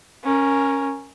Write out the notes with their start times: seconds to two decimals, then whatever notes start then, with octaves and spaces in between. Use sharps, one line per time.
0.24 C#4 A#4